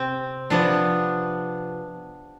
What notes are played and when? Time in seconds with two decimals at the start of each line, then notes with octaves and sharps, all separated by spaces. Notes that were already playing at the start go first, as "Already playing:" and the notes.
Already playing: C3 C4
0.50 C3 F3 B3 D4